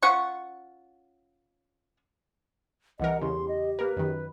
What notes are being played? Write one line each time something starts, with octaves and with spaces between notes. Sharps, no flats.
C#4 F4 F#5 C#6
C2 E3 A#4 D#5 F#5
E2 C#3 G4 C6
D#5
A#3 A#4 B4
F#2 D#3